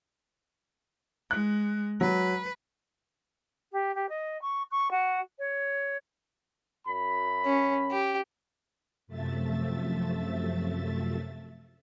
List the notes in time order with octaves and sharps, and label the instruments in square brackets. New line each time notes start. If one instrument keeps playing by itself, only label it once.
[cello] G#3 [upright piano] F#6
[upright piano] F#3 [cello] B4
[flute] G4
G4
D#5
C#6
C#6
F#4
C#5
[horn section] F#2 B5
[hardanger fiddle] C#4
G4
[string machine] F#2 C3 F3 A3 E5 A6